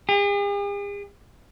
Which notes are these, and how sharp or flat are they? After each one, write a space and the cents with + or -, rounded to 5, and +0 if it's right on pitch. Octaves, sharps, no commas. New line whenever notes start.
G#4 -45